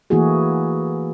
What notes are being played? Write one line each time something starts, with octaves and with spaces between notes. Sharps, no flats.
E3 A3 A#3 E4 F#4 G#4